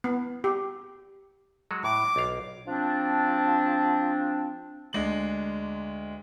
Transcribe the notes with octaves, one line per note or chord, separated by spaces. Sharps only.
B3
G4
F#3 G#3 F#4
A2 D6
B1 F5
F3 C4 D4
D2 G#3 D4 F#7